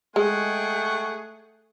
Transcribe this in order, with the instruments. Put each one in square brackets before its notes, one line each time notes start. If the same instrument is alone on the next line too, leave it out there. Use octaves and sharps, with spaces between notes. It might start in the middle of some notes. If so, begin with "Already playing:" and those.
[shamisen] G#3 [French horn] A3 [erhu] G#4 [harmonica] F#5 G5 C#6